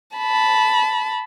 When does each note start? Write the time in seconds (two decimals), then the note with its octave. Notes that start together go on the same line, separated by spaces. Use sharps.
0.17 A5 B5